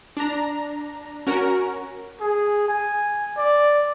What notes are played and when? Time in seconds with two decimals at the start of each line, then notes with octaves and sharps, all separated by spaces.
0.17 D4 A#5
1.27 C#4 F#4 A#4
2.20 G#4
2.68 G#5
3.37 D5